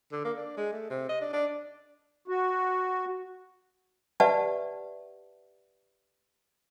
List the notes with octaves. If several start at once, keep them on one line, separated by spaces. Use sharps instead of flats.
D3
A#3
D4
G#3
A3
C3
D#5
D4
D4
F#4
G4 B4 D5 E5 F#5 A5